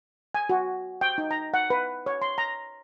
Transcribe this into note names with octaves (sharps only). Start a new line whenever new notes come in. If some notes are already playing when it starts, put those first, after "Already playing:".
G#5
F#4
G5
D#4
A#5
F#5
B4
C#5
C6
A#5